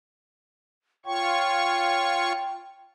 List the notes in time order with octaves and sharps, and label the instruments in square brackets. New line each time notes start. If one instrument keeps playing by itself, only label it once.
[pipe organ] F4 C#5 C#6 [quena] G5